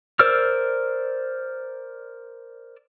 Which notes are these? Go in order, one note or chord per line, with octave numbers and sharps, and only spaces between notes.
A#4 C5 D5 E6 F6